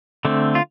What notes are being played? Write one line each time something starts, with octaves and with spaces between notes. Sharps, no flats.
D3 A3 C4
F4